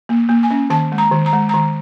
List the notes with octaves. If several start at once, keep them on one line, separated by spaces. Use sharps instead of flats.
A#3
A#3
G#5
C#4
D#3 A5
G#3
A#5
D#3
A#5
G#3
D#3 A#5